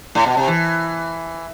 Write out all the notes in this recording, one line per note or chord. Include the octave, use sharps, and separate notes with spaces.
A2
B2
C3
E3